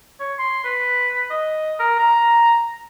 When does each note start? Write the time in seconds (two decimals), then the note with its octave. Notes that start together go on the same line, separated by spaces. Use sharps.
0.20 C#5
0.38 C6
0.64 B4
1.30 D#5
1.79 A#4
1.99 A#5